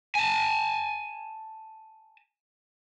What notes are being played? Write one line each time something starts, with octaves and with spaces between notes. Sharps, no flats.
G#5 A5